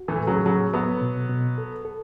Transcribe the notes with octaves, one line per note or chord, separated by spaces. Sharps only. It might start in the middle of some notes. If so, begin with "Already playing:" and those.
Already playing: F#4
E3 A3
A2
C#3 F#3
A2 C#3 F#3
F#3 B3 A4
B2
B2
A4
A4